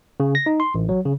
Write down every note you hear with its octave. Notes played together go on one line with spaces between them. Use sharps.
C#3
A#6
D#4
C6
A1
F#3
C#3